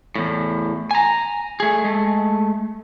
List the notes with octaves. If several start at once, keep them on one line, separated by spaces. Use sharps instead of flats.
E2 A2
G#5 A#5
A3 G#4
G#3 A3